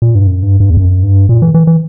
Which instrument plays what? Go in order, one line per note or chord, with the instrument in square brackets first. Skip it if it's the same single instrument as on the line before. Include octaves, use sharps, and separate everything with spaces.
[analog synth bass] A#2
G2
F#2
G2
G2
E2
F#2
G2
A#2
E3
E3
E3